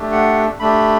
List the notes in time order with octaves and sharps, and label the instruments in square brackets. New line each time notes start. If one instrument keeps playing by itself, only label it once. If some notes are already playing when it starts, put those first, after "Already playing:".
Already playing: [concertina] A3 D4 G4
F#5
A3 D4 G4 B5